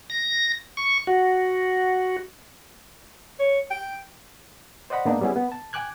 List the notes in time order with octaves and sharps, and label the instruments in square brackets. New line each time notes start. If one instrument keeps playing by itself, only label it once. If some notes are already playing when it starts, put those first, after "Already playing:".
[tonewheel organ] A#6
C#6
F#4
[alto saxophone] C#5
G5
[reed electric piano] C5 D5 D#5 F#5 B5
G#2 A#3 B3 D4 D#4
G3 B3 C#4 E4 G#4
B3
A5
G5 G#5 D6 F#6 G#6